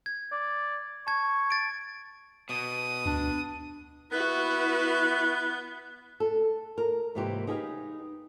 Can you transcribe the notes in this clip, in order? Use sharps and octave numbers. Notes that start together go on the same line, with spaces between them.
G#6
D5
A5 C#6 G#6
A6 D7
B2 D#6
D2 D4
B3 E4 F#4 B4
A4
A#4
G#2 C3 E3 A#3 G4 C5
D#4 G4 G#4 B4 D5 F5